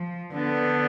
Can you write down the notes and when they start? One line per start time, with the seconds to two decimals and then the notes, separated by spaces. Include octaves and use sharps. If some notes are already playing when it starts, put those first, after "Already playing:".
Already playing: F3
0.34 D3 B3